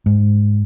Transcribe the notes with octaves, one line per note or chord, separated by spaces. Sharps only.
G#2